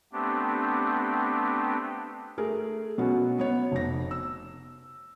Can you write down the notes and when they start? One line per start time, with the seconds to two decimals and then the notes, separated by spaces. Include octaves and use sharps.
0.13 A3 B3 C4 D4 G4
2.38 A3 G#4 A#4
2.98 B2 F#3 B3 C#4 F#4
3.39 B3 C#5
3.72 F1 B2 A#6
4.11 E6